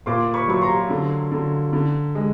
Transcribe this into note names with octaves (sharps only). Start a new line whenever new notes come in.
A#2 C6 D6
B5 C#6
F#3 C#6
A#5 C6
D3
D3
D3
G#3